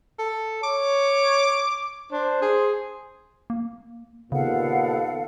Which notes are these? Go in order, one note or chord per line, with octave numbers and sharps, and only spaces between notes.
A4
C#5 D6
D4 C5
G#4
A#3
D#2 A#2 C#3 B3 A4 F5 F#5